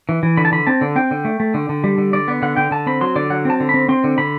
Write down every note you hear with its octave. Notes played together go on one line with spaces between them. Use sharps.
E3
E3
D3 B5
A5
D3 B5
C4 A5
D3
C4 G5
D3
A3
A3
D3
D3
G3
D3
D3 D5
B3
D3 F#5
D3 G5
D3 A5
C4 B5
F#3 C6
D3 D5
F#3 F#5
C4 A5
D3
B5
C4
C4 C6
D3
D3 B5